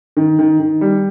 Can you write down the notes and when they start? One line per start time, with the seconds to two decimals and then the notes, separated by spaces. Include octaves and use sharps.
0.17 D#3
0.39 D#3
0.60 D#3
0.81 G3